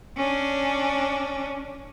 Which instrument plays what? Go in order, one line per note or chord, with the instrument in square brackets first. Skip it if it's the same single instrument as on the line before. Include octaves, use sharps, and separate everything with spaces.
[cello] C#4 D4